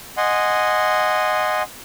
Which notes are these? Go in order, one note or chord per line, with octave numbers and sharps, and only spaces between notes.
D#5 F#5 G#5 C6